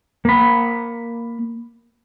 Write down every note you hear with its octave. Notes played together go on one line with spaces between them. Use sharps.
A#3 B5